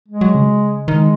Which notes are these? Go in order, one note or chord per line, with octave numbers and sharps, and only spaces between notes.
G#3
F#3
C#3
D#3 G#3